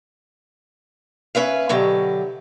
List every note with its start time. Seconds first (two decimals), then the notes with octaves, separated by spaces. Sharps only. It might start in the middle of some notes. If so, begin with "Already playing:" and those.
1.35 C#4 B4 E5 F5
1.69 B2 D3 F#3 G4